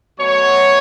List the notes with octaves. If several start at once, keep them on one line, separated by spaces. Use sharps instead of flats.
B2 F#3 A3 C#5